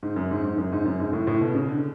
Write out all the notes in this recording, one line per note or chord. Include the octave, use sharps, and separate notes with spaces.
G#2
F#2
G#2
G#2
F#2
G#2
F#2
G#2
A2
A2
B2
C#3
D3